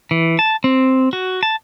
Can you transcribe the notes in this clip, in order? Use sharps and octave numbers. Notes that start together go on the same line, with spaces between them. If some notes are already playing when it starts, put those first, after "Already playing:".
E3
A5
C4
F#4
A5